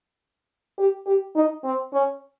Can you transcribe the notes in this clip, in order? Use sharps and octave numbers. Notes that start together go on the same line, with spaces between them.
G4
G4
D#4
C4
C#4